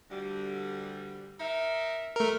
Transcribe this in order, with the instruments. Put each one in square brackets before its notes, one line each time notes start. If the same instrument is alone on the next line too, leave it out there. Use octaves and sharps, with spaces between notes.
[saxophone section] D2 D3 G3
D#4 A#4 E5
[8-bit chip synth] A3 A#4